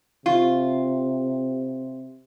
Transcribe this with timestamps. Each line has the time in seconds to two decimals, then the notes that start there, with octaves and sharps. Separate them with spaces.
0.26 C3 F4